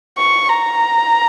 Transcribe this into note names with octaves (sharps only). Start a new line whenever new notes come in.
C#6
A#5